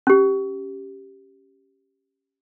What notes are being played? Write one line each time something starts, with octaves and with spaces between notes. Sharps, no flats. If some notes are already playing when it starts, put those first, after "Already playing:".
C#4 G4